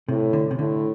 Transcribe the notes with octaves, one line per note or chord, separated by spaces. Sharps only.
A2 C3
D3
C3
A2 D3